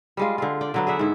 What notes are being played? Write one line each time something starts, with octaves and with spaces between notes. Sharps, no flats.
G3 G#3 F4
D3 C4 F4
D5 G5
D3 F#3 B3
G#4 D5 E5 F#5
G#2 E4